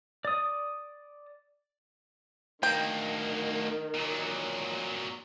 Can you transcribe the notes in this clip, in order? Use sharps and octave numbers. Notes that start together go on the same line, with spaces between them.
D5 D#6
D2 D#3 A#3 G5
A#2 F#3